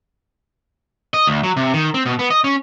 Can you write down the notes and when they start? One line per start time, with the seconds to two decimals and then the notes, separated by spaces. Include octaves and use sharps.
1.14 D#5
1.27 D2
1.44 F#3
1.57 C3
1.74 D#3
1.94 C4
2.06 B2
2.19 B3
2.30 D#5
2.44 C#4